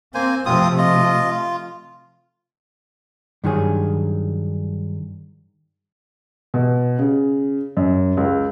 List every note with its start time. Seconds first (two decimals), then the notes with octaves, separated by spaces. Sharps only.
0.14 A#3 C4 C5 G#5
0.46 C3 F3 A3 C4 F4 D#6
0.78 F4 D#5
1.31 F4
3.44 G2 D#3 F#3 G#4
6.54 B2
6.99 C#3
7.77 F#2
8.17 C#2